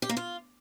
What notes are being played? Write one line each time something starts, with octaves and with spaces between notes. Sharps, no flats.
G4
A#3
F4